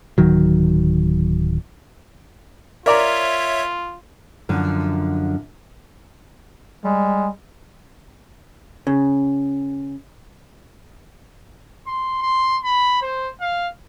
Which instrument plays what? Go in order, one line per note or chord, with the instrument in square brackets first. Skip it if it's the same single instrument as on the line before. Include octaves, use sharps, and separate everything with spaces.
[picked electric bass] D1 D#3 F#3
[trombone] F4 [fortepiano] A#4 D5 A#5 [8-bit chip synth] C#5 E5
[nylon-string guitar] F#2 D3 F3
[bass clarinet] G3 [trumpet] G#3
[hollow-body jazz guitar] C#3
[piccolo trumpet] C6
C6
B5
C5
F5